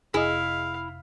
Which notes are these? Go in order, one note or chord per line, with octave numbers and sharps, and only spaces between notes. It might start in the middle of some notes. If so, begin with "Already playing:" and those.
F1 E4 G#4 D#5 F5